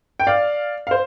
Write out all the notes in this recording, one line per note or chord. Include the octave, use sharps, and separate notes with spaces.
G5
D5 F5
F5
C5